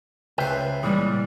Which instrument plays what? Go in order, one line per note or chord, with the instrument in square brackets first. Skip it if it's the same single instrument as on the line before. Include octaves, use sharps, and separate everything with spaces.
[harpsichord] C#2 C5 [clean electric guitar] B4 E5 G5
[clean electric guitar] A#2 E3 G#3 [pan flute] G3